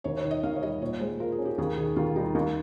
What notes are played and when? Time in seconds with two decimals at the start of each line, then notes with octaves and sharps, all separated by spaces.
0.04 D#2 C#5
0.17 C#5
0.24 D#3
0.31 D#5
0.43 D#2 F5
0.56 C#5
0.63 G3 D#5
0.81 A#2 C#5
1.00 G#3 C5
1.20 F4 A#4
1.32 G#4
1.39 C#4
1.45 G4
1.58 D#2 G#4
1.77 D#3 G#4
1.96 D#2 F4
2.16 G3 D#4
2.35 D#2 D#4